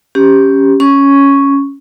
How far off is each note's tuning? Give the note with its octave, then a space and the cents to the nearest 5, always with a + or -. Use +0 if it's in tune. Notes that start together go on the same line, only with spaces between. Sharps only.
C#4 +0 G4 +0
C#4 +0 C#6 +0